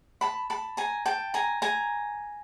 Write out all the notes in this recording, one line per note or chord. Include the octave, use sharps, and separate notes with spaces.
A5 B5
A5 B5
G#5 A#5
G5 A5
G#5 A#5
G#5 A#5